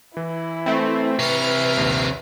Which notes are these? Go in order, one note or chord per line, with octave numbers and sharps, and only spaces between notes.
E3 E4
A3 C4
C3 B4 C#5 E5 F6 C7
A#1 D#2